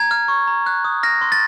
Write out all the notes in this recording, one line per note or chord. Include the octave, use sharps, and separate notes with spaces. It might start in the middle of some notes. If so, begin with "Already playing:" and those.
Already playing: A#5 G#6
F6
C#6
A#5
F#6
D#6
F6 A#6
C6
A6